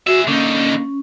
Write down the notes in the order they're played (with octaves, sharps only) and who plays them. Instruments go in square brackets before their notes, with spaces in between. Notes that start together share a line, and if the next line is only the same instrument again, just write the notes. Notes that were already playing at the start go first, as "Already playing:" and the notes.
[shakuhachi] F#4 [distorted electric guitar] G#4 E5
[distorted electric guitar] D3 D#4 [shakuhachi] A#3 [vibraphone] C#4